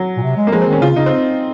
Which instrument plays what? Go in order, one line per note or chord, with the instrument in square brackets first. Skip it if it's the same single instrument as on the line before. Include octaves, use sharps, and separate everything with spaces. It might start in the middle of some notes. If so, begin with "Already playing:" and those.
Already playing: [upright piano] F#3
[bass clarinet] A#2
C3
G#3
[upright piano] A#3
[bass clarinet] F3 [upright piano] G#3
[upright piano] C4
[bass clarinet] D#3 [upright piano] C#4
[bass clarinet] C#3 [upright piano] F4
[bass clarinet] C#3 [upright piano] D#4
[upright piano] C4